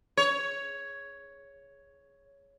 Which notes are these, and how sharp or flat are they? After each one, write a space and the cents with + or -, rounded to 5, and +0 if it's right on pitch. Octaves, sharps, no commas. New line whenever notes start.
C#5 +5